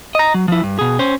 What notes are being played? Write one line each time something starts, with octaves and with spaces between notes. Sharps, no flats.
D#5 A#5
F#3
F3 E4
G2
B2 G#4
C#4 C5